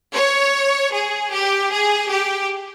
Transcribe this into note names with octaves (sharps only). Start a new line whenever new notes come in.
C#5
G#4
G4
G#4
G4